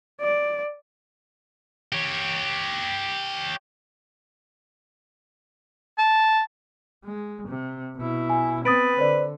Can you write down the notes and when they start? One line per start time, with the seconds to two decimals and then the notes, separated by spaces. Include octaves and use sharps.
0.21 D5
1.93 G4 C#5
5.98 A5
7.05 G#3
7.48 C3
7.97 B2 E4
8.30 G#5
8.65 B3 C4 B4 D#6 A6 D7
8.98 D3 C5 D5